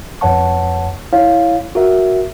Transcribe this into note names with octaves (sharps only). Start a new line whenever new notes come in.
F2 B4 C#5 F#5 A5 C#6
E4 C#5 F5
F#4 A#4 E5